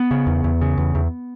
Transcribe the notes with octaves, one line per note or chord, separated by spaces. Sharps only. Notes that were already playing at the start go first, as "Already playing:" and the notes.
Already playing: B3
C#3
E2
E2
C#3
E2
E2